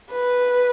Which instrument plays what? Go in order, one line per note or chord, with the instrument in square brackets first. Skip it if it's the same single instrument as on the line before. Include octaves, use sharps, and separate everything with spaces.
[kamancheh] B4